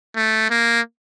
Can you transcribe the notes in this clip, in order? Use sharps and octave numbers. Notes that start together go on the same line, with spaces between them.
A3
A#3